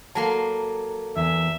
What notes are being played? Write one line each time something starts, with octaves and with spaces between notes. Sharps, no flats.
F#3 A#3 A4 A5 C6
E2 E5